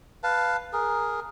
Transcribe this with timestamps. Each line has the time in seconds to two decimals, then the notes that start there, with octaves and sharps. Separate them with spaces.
0.23 B4 F5 A5
0.73 G#4 A#4